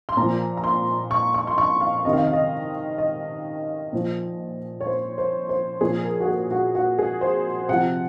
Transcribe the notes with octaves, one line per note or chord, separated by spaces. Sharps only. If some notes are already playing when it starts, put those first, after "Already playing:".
C6
A#2 F3 A#5
A#5
C6
C#6
C#6
C6
C#6
F5
C3 D#3 D#5
F5
D#5
F5
D#5
D#5
A#2 F3
C#5
C5
C5
C5
A#2 F3 G#4
A#4
F#4
G#4
F#4
F#4
G#4
C5
C3 F3 F#5